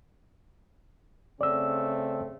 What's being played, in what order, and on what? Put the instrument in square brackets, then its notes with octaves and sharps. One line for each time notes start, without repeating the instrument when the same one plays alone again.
[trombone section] C#3 A3 C4 [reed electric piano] D5 E6